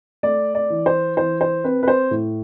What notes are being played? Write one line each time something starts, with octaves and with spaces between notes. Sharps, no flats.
A3 D5
D5
E3
C5
E3 C5
C5
C4 B4
B4
C5
A2